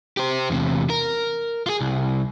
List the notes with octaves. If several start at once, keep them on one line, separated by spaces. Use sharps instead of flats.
G4 C5
E2 C3
A#4
F4 G#4
C2